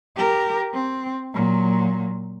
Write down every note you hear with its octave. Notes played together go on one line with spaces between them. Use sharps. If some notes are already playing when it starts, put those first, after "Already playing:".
G4 A#4
C4
A#2 F#3